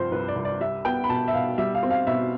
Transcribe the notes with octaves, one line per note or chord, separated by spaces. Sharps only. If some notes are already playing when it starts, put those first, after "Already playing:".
Already playing: G2 C3 F3 C5
C2 B4
D5
C2
D5
G3 E5
B3 G5
B5
B2 A5
E5
B2 F5
G3 E5
F5
C4
F5
B2 E5